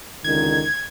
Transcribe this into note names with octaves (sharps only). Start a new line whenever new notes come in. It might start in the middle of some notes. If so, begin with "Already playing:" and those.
C#2 D3 D#3 G#6